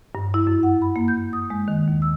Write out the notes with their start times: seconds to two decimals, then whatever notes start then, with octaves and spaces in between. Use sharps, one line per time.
0.15 G2
0.34 E4
0.47 F#2
0.63 F#5
0.82 B5
0.96 A#3
1.08 G6
1.33 D#6
1.50 G#3
1.68 D#3
1.88 D#2
2.02 E6